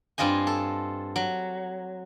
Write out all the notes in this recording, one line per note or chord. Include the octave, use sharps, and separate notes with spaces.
G2 C4 F4 D#5 G#5
A4
F#3